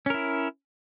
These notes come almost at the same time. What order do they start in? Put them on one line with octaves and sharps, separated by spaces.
C#4 A#4 E4